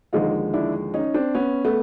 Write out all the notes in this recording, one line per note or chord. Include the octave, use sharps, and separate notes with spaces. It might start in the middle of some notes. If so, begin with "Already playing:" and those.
D#2 D3 F3 G#3 D#4 F4
D4 E4
C#4 D#4
C4 D4
B3 C#4
A3 B3